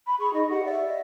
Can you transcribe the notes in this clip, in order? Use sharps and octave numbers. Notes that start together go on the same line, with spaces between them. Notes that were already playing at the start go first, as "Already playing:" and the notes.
B5
G#4 C#6
D#4 D#5
G4 F#5
D5 E5
D#5